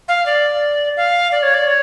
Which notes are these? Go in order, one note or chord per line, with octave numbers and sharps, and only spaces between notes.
F5
D5
F5
D5
C#5
D5
C#5